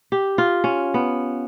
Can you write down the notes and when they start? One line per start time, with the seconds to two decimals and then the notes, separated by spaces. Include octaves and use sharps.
0.12 G4
0.38 F4
0.64 C#4
0.94 B3